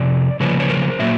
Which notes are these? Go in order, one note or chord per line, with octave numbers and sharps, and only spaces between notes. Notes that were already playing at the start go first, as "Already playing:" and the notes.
Already playing: F2 C3 D5
C#3 F3 A#3 C#4 B4 C#5
C#5
A#4 C5
A#2 F#3 A#3 E5